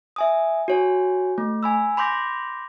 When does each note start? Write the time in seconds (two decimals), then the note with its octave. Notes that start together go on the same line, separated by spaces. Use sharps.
0.16 E5 G#5 D#6
0.68 F#4 C#5 G#5
1.38 A3
1.63 G#5 B5 E6
1.97 B5 C6 D6 G6 A#6